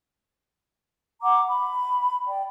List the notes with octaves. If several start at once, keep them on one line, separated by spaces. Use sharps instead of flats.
F#5 A#5 D6
B5
D5 G5